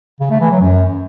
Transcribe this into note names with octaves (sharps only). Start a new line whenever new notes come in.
C#3
A3
E3
F#3
F#2